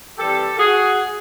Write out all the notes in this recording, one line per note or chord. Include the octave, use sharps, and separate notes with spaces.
E3 G3 C4 G4 A4
F#4 G#4